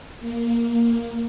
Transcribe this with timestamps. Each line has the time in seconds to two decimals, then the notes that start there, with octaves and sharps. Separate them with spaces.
0.20 A#3